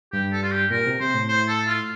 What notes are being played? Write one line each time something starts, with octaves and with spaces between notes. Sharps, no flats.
G2 G4
A4
F4
G4
A#2 A#4
C3
C3 C5
A2
C5
A4
F4